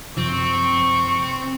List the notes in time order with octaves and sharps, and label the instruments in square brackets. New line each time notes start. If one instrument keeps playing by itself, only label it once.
[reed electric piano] F#2 C3 F3 [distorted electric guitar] C4 [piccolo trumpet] C#6